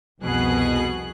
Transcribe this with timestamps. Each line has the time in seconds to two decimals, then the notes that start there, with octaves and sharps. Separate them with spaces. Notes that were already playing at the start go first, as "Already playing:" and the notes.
0.21 C2 F2 B2 G#4 F#6